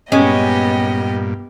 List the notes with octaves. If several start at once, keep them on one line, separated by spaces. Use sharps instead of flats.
G2 A#2 G#3 B3 C#4 G4 D#5